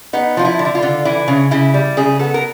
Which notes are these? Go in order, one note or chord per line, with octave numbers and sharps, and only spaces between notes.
B3 D#4
F3 F4
E4
D3
E4
F4
D3
E3 E4
C#3
C#3 E4
G3
C#3 G#4
B3 A4
A#4